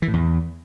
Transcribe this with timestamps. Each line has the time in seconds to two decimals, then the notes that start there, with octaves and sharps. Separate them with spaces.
0.02 E3
0.08 A2
0.13 E2